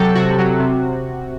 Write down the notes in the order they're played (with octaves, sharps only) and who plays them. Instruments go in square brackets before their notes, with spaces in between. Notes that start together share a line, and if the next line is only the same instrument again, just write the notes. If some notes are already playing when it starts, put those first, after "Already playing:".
Already playing: [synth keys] C3 F#3 G4 A4
C3 F#4
F#3
C3